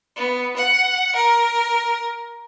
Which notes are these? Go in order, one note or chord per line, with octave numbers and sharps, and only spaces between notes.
B3
F#5
A#4